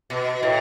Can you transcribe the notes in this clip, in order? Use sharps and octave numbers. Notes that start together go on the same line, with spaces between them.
B2
A2